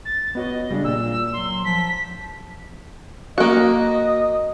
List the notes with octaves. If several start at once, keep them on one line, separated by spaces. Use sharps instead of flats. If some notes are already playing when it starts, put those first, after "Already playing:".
A6
B3 F#4 C#5 D#5
C#3 G3 D4
A#2 A#3 E6
F#3 C6
F3 B6
A#3 F#4 D#5